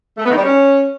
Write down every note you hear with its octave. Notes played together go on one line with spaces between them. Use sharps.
A3
B3
D#3
G3
C#4